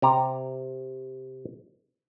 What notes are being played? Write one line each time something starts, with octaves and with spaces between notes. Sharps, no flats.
C3 G4 A#5